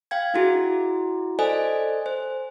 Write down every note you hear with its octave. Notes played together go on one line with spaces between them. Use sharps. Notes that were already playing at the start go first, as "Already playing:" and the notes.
F5 G5 G#6
D4 E4 F#4 G#4
A4 C5 D5 D#5 G#5
C5